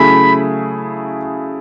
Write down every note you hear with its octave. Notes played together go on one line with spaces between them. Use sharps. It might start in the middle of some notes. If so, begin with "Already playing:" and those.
Already playing: C#3 F#3 A3 E4 G#4 B5